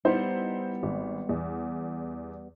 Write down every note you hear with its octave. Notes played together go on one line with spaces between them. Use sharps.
G3 B3 D#4 E4 C5
G#1
E2